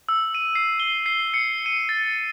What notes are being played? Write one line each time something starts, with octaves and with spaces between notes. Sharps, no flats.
E6
D#7
C7
G7
C7
C#7
D#7
A6